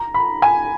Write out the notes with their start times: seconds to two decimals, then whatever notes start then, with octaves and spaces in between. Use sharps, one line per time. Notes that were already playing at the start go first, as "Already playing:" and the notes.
Already playing: A#5
0.14 B5
0.42 G#5